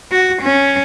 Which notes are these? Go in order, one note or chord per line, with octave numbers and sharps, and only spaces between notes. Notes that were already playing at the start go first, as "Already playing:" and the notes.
F#4
C#4